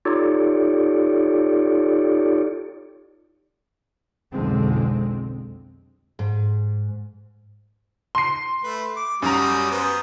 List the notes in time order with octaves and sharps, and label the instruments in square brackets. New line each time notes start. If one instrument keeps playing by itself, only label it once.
[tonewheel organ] D#4 F4 G4 A4 C#5 D5
[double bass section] B1 F2 D3 G#3 C4
[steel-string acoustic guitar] G#2
[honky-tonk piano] C6 C7
[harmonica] A3 B4
D6
[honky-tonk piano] F#2 A#5 [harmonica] G3 F#4 D#6
[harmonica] B3 C5 D#6